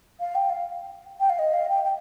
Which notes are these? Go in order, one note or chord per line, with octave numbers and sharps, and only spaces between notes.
F5
G5
F5
G5
F5
D#5
F5
G5
G5